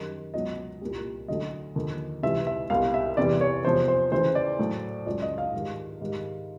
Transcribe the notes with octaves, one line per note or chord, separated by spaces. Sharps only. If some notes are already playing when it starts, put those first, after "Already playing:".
Already playing: F#2 D#3 G3
C#2 B2 F#3 D#5
C2 A#2 G3
D2 D3 F#3 D#5
D#2 D3 F3
C#2 C3 E3 G3 E5
E5
C2 B2 G3 F5
E5
E2 C3 E3 G3 D5
C#5
E2 C3 F3 C5
C5
D2 C#3 E3 C5
D5
A2 F#3
C#2 C#3 F#3 D5
D#5
F5
G#2 D#3 G3
G#2 D#3 G3